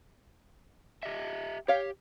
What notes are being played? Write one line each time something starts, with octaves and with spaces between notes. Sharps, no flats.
G4 D#5 E5
G4 C#5 F5